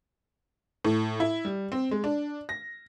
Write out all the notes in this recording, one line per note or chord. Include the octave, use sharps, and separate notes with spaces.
A2
E4
G3
C4
G#3
D4
A#6